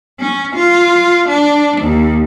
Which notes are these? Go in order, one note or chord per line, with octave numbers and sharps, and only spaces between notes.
C#4
F4
D4
D#2